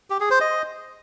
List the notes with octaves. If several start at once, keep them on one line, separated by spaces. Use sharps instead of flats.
G4
G#4
C5
D#5